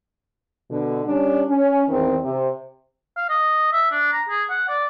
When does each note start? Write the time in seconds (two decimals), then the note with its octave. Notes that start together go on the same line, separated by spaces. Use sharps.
0.70 B2 D3
1.06 G3 C#4 D4
1.48 C#4
1.88 E2 D#3 C4
2.23 C3
3.17 F5
3.30 D#5
3.73 E5
3.91 D4
4.13 A#5
4.29 G#4
4.50 F#5
4.69 D5